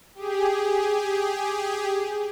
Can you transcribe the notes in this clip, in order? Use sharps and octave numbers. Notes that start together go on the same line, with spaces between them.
G4 G#4